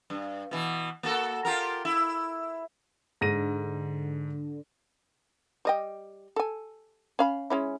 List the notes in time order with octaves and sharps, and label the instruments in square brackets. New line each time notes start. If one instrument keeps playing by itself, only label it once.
[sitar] G2
B2 E3
A#3 F#4 A4
F4 G4 A#4
E4
[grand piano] G#2 A#6 D#7 [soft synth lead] D3
[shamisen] G3 D#5 G5
A4 G#5
C#4 F5 B5
G#3 C#4 E4